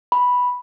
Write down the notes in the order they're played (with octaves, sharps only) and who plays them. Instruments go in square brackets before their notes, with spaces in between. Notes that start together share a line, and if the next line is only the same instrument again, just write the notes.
[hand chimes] B5